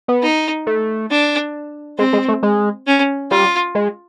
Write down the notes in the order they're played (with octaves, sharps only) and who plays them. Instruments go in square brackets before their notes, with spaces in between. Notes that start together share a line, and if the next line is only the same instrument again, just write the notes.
[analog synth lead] B3
[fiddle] D#4
[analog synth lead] A3
[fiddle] D4
[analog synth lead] G#3 [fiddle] C4
[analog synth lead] G#3
A3
G#3
[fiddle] C#4
[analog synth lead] G3 [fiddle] F4
[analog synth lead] G#3